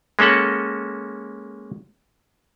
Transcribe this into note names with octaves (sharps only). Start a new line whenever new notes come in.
G#3 A#3 C#4 A4 F#5